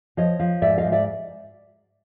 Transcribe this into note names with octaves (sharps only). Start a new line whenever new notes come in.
F3 C#5 D#5
F3
G#2 D5 E5
D#5 F5
G#2
D5 E5